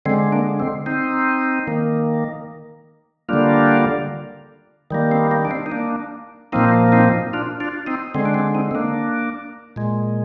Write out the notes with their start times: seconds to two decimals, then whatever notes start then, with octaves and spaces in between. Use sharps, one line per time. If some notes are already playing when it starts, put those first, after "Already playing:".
0.06 D3 G#3 C4
0.32 A#3 D4
0.60 C4
0.86 C4 D#4
1.67 D#3 A#3
3.29 D3 G3 A#3 D4 F4
4.91 D#3 G3 A#3
5.12 C4
5.31 A#3
5.45 D4
5.51 C4
5.66 D#4
5.72 A#3 D4
6.52 A#2 F3 A#3 C4 D#4
6.92 C4 D#4
7.33 D4 F4
7.60 D4 F4
7.87 C4 D#4
8.14 D3 G#3 C4
8.25 D4
8.34 C4
8.55 C4 D#4
8.71 C4
8.75 A#3 D4
9.76 A#2 G#3